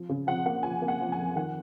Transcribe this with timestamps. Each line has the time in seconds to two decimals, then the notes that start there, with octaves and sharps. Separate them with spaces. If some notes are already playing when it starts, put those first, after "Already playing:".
Already playing: F3
0.09 C#3
0.27 F3 F#5
0.46 A#3 F#5
0.63 F3 G#5
0.82 A#3
0.88 F#5
1.00 F3
1.12 G#5
1.18 F2
1.36 D#3 F#5